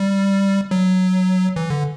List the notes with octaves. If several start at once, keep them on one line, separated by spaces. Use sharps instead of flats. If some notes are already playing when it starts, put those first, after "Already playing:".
Already playing: G3
F#3
E3
D3